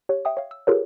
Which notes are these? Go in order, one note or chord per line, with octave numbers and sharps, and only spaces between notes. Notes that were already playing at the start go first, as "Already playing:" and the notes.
G4 C#5
E5 G5 D#6
C#5 F5
E6
F4 G4 G#4 A#4 B4 C#5